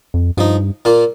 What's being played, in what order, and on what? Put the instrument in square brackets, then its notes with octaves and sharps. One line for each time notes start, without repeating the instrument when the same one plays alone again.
[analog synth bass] F2
[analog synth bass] G2 [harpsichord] F3 D#4
[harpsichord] A#2 A#3 F4